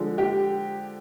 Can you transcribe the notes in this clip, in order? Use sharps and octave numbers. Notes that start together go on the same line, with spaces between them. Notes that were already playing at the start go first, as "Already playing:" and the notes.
Already playing: D3 F3 G#3
G4